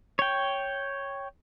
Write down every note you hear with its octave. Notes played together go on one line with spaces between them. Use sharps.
C#5 G5